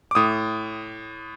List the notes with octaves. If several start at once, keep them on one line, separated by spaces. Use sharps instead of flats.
D6
A2 D#6